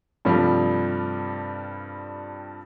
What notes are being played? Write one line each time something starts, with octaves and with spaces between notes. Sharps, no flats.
G2 C3 F3 G3 A3